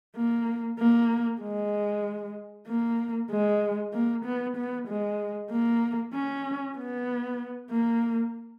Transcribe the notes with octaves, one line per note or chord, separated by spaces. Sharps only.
A#3
A#3
G#3
A#3
G#3
A#3
B3
B3
G#3
A#3
C#4
B3
A#3